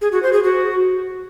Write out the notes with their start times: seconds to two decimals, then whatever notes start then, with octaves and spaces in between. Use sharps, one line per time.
0.01 G#4
0.12 F#4
0.23 C5
0.33 G#4
0.44 F#4